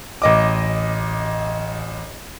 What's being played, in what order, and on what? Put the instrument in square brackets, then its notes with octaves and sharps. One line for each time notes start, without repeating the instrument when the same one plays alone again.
[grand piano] A1 D#5 D6